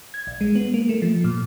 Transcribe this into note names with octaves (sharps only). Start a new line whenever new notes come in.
G#6
A#1
G#3
B3
A#3
A3
F3
A#2